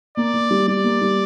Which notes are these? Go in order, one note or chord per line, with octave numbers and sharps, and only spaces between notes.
A#3 D5
A#3
G3
G3 D5
A#3
G3